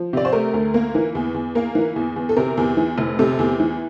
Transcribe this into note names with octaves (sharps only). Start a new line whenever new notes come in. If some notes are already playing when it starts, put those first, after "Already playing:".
Already playing: F3
C3 D5
C5
A3 A#4
D2
A#3
E3
E2
E2
A#3
E3
E2
E2
A4
C3 A#4
E2
E3
F1
C3 A4
E2
E3